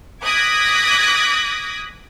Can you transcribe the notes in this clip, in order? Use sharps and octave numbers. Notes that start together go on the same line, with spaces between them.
D6 D#6 F#6 G#6 A#6 B6